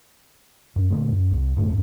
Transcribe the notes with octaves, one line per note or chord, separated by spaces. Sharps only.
F#2
A#2 D3 A3
F#2
C2
F#2 A2 D3 A3
G#1 E2 G2